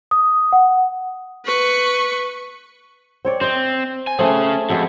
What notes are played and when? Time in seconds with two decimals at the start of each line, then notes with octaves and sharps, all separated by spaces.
0.11 D#6
0.53 F#5
1.45 B4 C#6
3.25 C4 C#5 D5
3.41 C4 C5 D#5
4.07 G#5
4.19 A3 C4 C#4 G#4
4.70 F2 G#3 F#4 A4